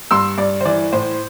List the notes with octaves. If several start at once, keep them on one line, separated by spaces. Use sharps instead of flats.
G2 C6 E6
G2 D5
C5
E3 D5
A2 C5